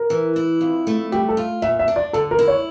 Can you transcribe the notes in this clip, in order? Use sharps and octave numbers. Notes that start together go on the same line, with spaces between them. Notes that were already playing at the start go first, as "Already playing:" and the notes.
Already playing: A#4
E3
E4
F2
A3
G3 G4
A4
F4
A#2 E5
E5
D4
D5
D3 A4
A#4
E4
C#5